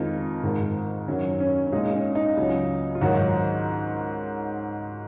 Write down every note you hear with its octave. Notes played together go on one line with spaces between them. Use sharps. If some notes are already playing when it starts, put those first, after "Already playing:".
Already playing: F2 D#3 G#3 D#4 F4
G#2 D#3 G#3
F#2 D#3 F#3 C#4
C#4
C#4
A#2 G#3 D#4
C#4
D#4
C#2 C#3 F#3
F4
G#2 D#3 F#3 F#4